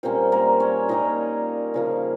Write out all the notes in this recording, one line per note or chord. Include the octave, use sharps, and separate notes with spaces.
A#2 G3 A#3 C4 C#4 C5
A#3 A#4
C#4 C#5
A#2 G3 A#3 C#4 D#4 D#5
C#3 F3 A#3